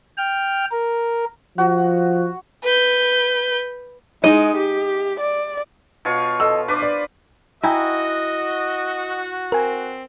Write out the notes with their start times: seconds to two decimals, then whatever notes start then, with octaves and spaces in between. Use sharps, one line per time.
0.18 G5 F6
0.71 A#4
1.58 F3 F#4
2.63 B4 G6
4.24 G#3 D#4 D#5
4.57 G4
5.20 D5
6.05 B2 F4 C#5
6.40 A4 D#5 E6
6.68 D4 B4 C5 D6
6.82 D5
7.63 E4 F#4 D#5 G5 G#5 A#5
9.52 C4 A#4 G#5